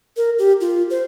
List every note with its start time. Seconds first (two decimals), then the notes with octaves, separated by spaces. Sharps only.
0.17 A#4
0.39 G4
0.61 F4
0.90 C5